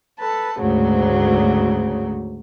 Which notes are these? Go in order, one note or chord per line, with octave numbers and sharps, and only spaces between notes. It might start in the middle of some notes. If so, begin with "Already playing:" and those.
A4 B4 A5
D2 G#2 C#3 F#3 A3